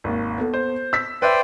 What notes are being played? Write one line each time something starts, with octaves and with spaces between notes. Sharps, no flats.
G#1 D#2
B3 A4
C5
E6 B6
B4 C5 D5 E5 G5